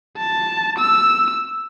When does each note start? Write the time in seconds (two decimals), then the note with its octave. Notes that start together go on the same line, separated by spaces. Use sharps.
0.17 A5
0.78 E6